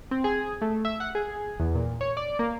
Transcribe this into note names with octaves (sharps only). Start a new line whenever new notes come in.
C4
G#4
A3
E5
F#5
G#4
E2
A#2
C#5
D5
A#3